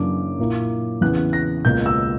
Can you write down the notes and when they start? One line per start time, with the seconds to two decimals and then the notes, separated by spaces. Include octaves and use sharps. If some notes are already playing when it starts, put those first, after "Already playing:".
Already playing: F#2 C#3 E3 A#3 D4 D6
0.38 A#2 A#3 E4
1.01 E2 C#3 E3 B3 F#6
1.33 A#6
1.64 C#2 B2 A#3 G6
1.86 E6